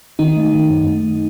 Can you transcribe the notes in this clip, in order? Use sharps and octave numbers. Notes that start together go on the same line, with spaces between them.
D#3 D#4
A3
D#3
F#2
A3